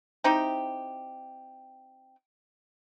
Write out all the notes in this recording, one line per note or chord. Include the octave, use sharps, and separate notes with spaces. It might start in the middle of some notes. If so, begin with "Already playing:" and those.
C4 D#4 E4 G4